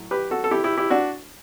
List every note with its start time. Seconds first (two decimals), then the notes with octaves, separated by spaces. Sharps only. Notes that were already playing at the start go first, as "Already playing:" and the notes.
Already playing: A2 F#3
0.11 G4 B4
0.31 F#4 A4
0.44 A4
0.51 E4 G4
0.64 E4 G4
0.77 E4 G4
0.90 D4 F#4